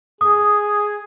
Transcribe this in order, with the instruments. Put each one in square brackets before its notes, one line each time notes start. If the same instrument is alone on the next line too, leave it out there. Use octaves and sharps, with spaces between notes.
[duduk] G#4 [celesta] D#6